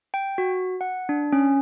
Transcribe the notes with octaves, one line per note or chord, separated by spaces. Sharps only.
G5
F#4
F#5
D4
C#4